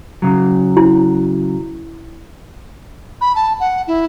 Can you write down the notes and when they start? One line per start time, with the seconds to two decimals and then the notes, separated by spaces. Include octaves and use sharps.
0.22 C#3 F#3
0.77 E4
3.21 B5
3.36 A5
3.60 F#5
3.87 E4